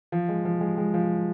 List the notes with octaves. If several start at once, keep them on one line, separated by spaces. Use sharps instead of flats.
F3
G#3
F3
G#3
G#3
F3